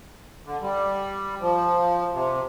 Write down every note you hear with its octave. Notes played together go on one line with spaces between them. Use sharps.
D3
G3
F3
C3